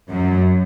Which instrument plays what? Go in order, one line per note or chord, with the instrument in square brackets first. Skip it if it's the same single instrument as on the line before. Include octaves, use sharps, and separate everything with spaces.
[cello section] F#2 F#3